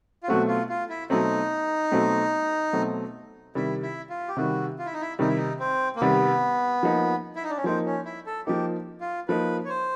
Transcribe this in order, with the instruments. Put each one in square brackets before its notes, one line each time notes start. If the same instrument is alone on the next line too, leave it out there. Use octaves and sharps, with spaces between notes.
[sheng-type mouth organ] F4
[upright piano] B2 F#3 A3 C4 [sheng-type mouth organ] F#4
[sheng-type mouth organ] F4
F4
E4
[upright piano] B2 F#3 A3 C4 [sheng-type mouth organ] D#4
[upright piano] B2 F#3 A3 C4
B2 F#3 A3 C4
[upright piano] C3 D#3 G3 [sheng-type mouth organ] E4
[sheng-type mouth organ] E4
F4
G4
[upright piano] C3 D#3 G3 [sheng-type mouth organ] F#4
[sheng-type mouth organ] F4
E4
D#4
E4
[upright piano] C3 D#3 G3 [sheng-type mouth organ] D#4
[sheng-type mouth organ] E4
D#4
C4
A#3
[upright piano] C3 D#3 G3 [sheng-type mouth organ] B3
[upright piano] F3 A#3 D#4
[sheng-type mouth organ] E4
D#4
D4
C#4
[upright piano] F3 A#3 D#4 [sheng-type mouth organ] C4
[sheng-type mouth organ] C#4
E4
A4
[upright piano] F3 A#3 D#4 [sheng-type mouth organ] G4
[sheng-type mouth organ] F4
[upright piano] F3 A#3 D#4 [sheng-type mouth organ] B4
[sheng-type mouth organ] C#5
C5